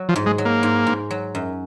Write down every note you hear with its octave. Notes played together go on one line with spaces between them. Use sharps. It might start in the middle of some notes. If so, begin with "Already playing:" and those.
Already playing: F#3
F3
G#2
G#3
F#3
A#3
G#2
G#2
F#3
F#2